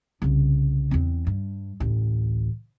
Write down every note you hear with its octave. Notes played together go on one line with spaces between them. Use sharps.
C2 C#3
E2 C4
G2
A1 D2